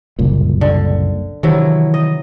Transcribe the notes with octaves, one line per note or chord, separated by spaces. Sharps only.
F#1 C2 A#2
D3
C3 D#3 E3 F#3 E4
D#5